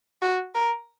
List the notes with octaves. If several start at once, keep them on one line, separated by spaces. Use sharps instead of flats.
F#4
A#4